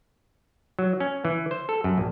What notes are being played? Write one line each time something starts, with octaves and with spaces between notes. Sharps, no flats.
F#3
C#4
E3
C5
A4
F#2
A#1